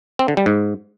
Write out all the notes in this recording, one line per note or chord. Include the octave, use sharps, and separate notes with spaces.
C4
D3
G3
G#2